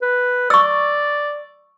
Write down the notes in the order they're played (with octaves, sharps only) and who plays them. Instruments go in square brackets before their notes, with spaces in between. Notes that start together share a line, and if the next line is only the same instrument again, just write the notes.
[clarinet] B4
[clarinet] D5 [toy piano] C#6 E6